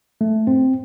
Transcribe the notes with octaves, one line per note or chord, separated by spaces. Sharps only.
A3
C4